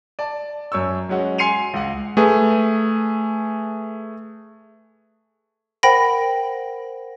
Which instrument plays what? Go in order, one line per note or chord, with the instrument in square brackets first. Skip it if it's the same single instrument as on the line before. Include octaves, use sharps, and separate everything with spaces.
[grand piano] D5 A5
F#2 C#5 C#6 E6
F#3 G#3 C#4 F#4
G#5 C6 C7 C#7 D#7 F7
C#2 F#5
[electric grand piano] A3 G#4 B4
[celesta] A#4 C5 F#5 [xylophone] G5 B5 A#6